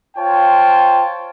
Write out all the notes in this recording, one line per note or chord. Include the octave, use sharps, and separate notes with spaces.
F4 C5 C#5 G5 A5